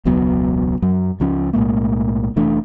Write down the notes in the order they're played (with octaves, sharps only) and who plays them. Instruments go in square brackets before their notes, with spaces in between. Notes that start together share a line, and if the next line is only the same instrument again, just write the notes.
[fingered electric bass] E1 C#2 F#3 B3
F#2 F#3
C#2 F3 C#4
B1 A2 G#3 A#3
F1 E3 A3 D4